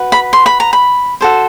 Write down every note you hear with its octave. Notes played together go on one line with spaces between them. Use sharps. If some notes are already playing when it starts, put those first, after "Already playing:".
Already playing: F#4 B4
B5
C6
B5
A#5
B5
F#4 A4 C5